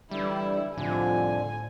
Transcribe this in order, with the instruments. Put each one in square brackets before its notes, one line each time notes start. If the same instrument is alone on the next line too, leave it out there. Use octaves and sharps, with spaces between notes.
[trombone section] D3 E3 D4 [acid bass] G3 [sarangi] E4
[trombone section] C2 F2 F3 [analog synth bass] A2 [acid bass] D3 [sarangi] G#5